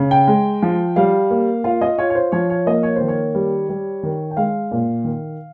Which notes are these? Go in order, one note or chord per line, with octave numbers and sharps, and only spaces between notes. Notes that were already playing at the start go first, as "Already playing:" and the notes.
Already playing: C#3
G5
G#3
F3
G3 F5
A#3
F4 F5
D#5
F4 C#5
C#5
C5
F3 C#5
C#5
A#3 D#5
C#5
C5
D#3
C#5
G3
G3
D#3
G5
G#3 F5
A#2
D#3